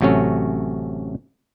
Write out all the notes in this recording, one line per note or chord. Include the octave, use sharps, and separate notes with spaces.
A1 C3 F#3 A3 C#4